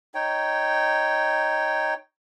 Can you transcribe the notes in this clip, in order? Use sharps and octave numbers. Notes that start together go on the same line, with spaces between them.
D#4 C#5 G5